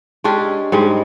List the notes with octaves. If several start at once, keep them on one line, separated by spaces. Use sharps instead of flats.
G#3 C#4 D4 G4
G#2 G3 G#3